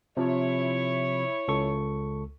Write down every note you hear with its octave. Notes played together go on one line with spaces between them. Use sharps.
C3 F3 E4 C#5
C#2 A4 C#6